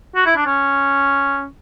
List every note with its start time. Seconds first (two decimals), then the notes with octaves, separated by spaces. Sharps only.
0.16 F#4
0.26 E4
0.36 D4
0.46 C#4